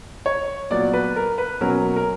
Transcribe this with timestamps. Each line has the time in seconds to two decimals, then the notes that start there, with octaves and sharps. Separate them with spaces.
0.26 C#5
0.70 A#2 F#3 B3 D5
0.94 B4
1.16 A#4
1.38 B4
1.61 B2 F#3 A#3 C#4 A#4
1.96 A#4